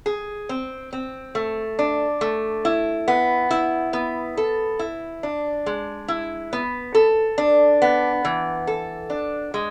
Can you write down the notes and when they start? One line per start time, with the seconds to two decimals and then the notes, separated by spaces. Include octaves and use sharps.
0.06 G#4
0.49 C4
0.93 C4
1.35 A3
1.79 D4
2.21 A3
2.65 E4
3.08 B3
3.51 E4
3.93 B3
4.37 A4
4.79 E4
5.23 D4
5.66 G#3
6.08 E4
6.53 B3
6.95 A4
7.38 D4
7.82 B3
8.25 E3
8.67 A4
9.10 D4
9.54 G#3